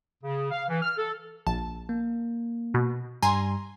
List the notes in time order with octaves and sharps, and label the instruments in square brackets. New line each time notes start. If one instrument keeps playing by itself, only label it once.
[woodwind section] C#3
F5
E3
F6
A4
[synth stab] A#1 A5
[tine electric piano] A#3
[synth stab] B2
[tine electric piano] G2 G3 [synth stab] G#5 A#5 C6